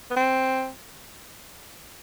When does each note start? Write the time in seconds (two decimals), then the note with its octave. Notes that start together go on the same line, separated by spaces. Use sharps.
0.10 B3
0.16 C4